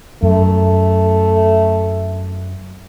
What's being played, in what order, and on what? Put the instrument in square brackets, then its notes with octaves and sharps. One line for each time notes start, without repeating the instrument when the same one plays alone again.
[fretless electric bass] F#2 [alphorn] A3